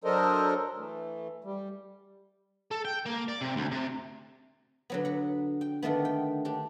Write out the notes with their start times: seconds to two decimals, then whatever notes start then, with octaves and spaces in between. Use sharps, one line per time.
0.04 F#3 D4 A4 A#4 C5 D#5
0.78 E3 A3
1.44 G3
2.71 A4
2.85 G5
3.06 A#3
3.28 D5
3.41 C3
3.56 D2
3.72 C3
4.90 D3 F#3 B3
5.05 B4 F#5
5.61 G5
5.82 D3 D#3 A3 B3
6.05 G5
6.45 D4 G4